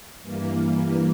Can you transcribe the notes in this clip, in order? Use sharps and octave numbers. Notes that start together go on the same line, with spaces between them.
G2 E3 A#3